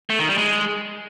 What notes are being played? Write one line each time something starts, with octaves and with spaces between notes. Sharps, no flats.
A3
D#3
G3
G#3